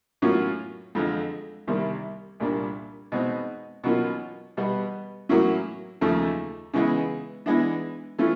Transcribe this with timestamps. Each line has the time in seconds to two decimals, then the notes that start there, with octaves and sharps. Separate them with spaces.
0.22 A2 F#3 A#3 C#4 F4
0.95 F2 D3 F3 G#3
1.68 C2 C3 D#3 G3 A#3
2.40 C2 A#2 G3 A#3 D4
3.12 B2 G#3 C4 D#4
3.84 B2 F#3 A#3 C#4 F4
4.57 B2 G3 B3
5.29 A2 F#3 A#3 C#4 E4
6.01 D#2 C#3 F3 A3
6.74 C#3 E3 G#3 B3
7.46 E3 G#3 B3 D4
8.18 E3 A3 C#4 F4